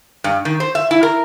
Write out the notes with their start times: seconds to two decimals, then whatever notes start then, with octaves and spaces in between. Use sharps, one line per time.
0.24 G2
0.45 D#3
0.60 C5
0.75 E5
0.91 E4
1.03 A#4